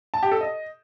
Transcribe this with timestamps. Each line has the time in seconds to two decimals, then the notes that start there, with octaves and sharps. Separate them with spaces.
0.14 A5
0.23 G4
0.32 A4
0.41 D#5